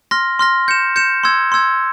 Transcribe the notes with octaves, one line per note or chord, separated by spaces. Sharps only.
C6 F6 A#6
C6 F6 A#6
G6 C#7 E7
G6 C#7 E7
C6 E6 G#6
C6 E6 G#6